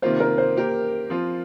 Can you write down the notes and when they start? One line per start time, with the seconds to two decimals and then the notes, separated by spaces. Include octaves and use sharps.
0.02 C3 D#3 A#3 F4 C5
0.20 A#4
0.38 C5
0.56 A#3 G4 A#4
1.10 F3 C4 F4